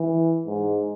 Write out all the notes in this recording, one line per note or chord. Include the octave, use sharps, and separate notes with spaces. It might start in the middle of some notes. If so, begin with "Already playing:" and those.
Already playing: E3
G#2